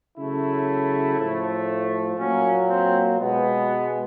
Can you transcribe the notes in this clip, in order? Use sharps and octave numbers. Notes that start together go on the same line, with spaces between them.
C#3 F#3 A3 E4
A2 F3 A3
A#2 F#3 A#3 C#4
C4
B2 G#3 B3